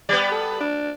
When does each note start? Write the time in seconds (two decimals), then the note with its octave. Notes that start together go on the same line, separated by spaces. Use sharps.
0.09 G3 B3 D5
0.32 A4
0.60 D4